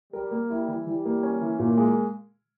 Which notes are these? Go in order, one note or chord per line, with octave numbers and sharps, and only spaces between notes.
G3 A#4
A#3
G3 E4
E3
E3 G3
A#3
C#4
E3
A#2 A#3
G#3